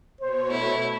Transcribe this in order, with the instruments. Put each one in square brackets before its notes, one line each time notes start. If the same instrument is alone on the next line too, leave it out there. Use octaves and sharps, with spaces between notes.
[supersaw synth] B2 C#5 [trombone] C5
[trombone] A3 [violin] E4